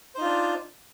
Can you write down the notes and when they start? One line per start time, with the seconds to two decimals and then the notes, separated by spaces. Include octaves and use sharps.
0.15 C5
0.18 D#4
0.21 F4
0.24 D4